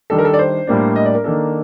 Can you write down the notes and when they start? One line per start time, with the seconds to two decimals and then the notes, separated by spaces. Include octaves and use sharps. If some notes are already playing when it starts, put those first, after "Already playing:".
0.10 D#3 G3 D4 A4
0.19 A#4
0.25 A4
0.34 D5
0.39 C5
0.67 A2 G3 A#3 D4
0.96 D#5
1.06 D5
1.15 A#4
1.24 D#3 A#3 D4 A4